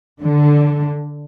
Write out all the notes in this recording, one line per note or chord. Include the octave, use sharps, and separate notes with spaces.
D3